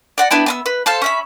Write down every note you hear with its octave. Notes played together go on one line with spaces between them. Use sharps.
D5 F#5 A#5
B3 D4 E4 G5
B3 A5 E6
B4
A4 C5 F5 A5
C#4 E5 B5